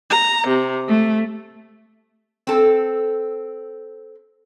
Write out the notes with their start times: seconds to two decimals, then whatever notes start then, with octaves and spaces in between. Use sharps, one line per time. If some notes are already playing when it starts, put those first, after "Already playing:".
0.11 A#5
0.47 C3
0.87 A3
2.47 C4 A4